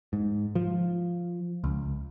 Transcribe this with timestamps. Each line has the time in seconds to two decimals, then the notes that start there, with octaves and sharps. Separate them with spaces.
0.13 G#2
0.55 F3
1.64 C#2